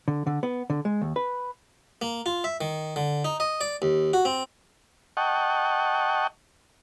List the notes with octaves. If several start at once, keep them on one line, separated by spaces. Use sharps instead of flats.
D3
D3
B3
D3
G#3
D#2
B4
A#3
F4
E5
D#3
D3
D#4
D#5
D5
D#2
F#4
C4
D#5 F#5 G5 A5 C#6